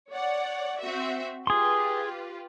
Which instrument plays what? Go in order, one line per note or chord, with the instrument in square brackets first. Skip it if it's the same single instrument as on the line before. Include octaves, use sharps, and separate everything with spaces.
[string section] C#5 D5 F#5
C4 F#4 E5
[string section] F4 G4 B4 [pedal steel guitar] G#4 C6